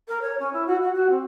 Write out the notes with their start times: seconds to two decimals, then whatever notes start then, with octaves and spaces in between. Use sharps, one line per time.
0.08 A#4
0.22 C#5
0.39 C#4
0.53 E4
0.67 F#4
0.82 F#4
0.94 F#4
1.10 C4